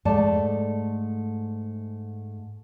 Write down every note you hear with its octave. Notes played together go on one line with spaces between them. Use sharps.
G#2 A3 D5 A5